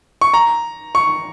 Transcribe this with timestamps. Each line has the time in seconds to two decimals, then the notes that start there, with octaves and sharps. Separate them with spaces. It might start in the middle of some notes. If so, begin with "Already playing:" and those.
0.21 C#6
0.34 A#5
0.95 C#6